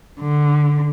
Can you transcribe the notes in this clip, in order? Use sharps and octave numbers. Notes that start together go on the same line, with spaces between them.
D3